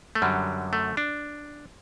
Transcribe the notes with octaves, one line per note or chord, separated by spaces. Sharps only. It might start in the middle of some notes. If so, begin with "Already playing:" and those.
A3
F#2 D3 F#3 G3
A3
D4